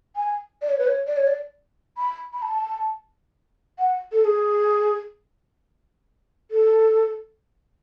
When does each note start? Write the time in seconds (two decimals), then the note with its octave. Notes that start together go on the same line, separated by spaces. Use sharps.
0.16 G#5
0.62 D5
0.70 C#5
0.79 B4
0.87 C#5
1.07 D5
1.17 C#5
1.27 D5
1.97 B5
2.33 B5
2.42 A5
3.79 F#5
4.12 A4
4.25 G#4
6.51 A4